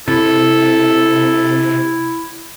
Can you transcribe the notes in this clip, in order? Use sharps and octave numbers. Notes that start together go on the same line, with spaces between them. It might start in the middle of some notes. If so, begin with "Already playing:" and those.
C3 E4 A4